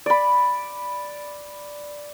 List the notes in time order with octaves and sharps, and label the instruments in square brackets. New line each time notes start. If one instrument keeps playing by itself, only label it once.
[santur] D5 B5